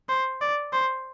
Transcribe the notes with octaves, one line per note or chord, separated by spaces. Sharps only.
C5
D5
C5